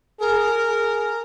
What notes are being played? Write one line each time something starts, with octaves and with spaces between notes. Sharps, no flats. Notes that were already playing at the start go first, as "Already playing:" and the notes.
G#4 A#4
G#4